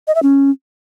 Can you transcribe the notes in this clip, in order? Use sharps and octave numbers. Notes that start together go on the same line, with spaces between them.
D#5
E5
C#4